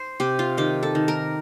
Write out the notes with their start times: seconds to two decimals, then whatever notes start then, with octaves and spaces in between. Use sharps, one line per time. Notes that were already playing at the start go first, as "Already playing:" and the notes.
Already playing: C5
0.20 C3 G4
0.39 F4
0.57 D#3 G4
0.83 A4
0.95 D#3
1.08 A#4